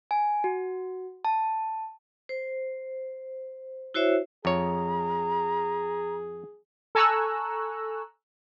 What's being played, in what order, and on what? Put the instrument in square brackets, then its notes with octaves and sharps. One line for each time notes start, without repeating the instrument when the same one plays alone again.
[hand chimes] G#5
F#4
A5
[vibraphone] C5
E4 F#4 C5 C#5 E5
[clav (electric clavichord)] F2 C#5 [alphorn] G#4 [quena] A#5
[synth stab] A4 G#5 A#5 C#6 E6 F#6